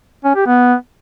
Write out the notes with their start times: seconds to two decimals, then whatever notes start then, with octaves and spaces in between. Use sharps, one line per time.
0.25 C#4
0.35 G4
0.46 B3